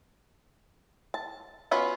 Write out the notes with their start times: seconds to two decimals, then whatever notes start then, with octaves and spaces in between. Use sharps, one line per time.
1.14 A5
1.71 B3 C#4 F4 F#4 B4